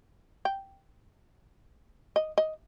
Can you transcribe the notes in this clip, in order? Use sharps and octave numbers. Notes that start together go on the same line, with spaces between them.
G5
D#5
D#5